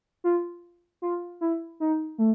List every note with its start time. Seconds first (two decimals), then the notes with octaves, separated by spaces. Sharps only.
0.24 F4
1.02 F4
1.41 E4
1.80 D#4
2.18 A3